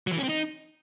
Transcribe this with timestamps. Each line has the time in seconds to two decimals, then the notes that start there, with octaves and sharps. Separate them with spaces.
0.07 F#3
0.13 E3
0.18 C#4
0.24 C4
0.29 D#4